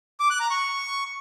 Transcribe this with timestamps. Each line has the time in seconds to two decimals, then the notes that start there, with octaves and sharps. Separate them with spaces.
0.20 D6
0.30 F#6
0.40 A#5
0.50 C#6